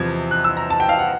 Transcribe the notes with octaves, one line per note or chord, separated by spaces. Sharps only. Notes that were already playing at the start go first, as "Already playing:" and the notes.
Already playing: E2 C3 F3 G#6
F#6
E6
A#5
A5
G5
F5
F#5